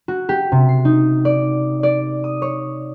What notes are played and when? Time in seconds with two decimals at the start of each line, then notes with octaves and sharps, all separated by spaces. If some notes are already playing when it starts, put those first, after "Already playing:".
0.08 F#4
0.29 G4
0.52 C3
0.69 C7
0.85 D#4
1.25 D5
1.83 D5
2.24 D#6
2.42 C#5